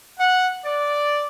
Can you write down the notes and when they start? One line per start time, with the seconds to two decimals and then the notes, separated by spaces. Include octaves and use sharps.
0.19 F#5
0.65 D5